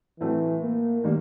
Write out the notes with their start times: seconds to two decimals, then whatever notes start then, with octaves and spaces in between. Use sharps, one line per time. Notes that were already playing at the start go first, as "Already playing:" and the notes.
0.20 A2 E3 F#3 A3 C4
0.62 A#3
1.04 D#3 G3 A#3